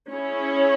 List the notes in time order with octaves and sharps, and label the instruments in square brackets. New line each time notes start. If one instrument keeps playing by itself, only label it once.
[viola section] C#4 E4 G#4 C#5